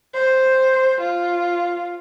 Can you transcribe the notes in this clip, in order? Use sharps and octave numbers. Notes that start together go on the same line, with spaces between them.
C5
F4